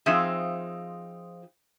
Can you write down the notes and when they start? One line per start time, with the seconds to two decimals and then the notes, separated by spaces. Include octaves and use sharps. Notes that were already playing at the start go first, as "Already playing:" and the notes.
0.06 F3 C4 D#4 F4 G#4 E5